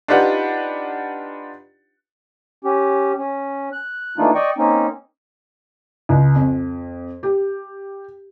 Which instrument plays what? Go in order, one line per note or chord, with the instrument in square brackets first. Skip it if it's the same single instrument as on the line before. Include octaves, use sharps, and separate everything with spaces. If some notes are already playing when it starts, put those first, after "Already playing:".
[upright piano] D4 D#4 F4 G4 B4 F#5
[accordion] C#4 G4
C#4
F#6
E3 A3 A#3 D4 D#4 F4
D5 D#5 G5 C#6
A#3 C4 C#4 D#4
[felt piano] C#2
F2
G4